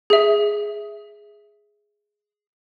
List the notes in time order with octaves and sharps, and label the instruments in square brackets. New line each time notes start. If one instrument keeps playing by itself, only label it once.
[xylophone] G#4 E5